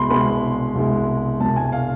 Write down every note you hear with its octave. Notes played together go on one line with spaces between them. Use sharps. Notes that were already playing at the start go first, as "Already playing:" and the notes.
Already playing: C2 B2 G#3 B5 C6
C2 B2 G#3 B5
C2 B2 G#3
C2 B2 G#3 A5
G#5
F5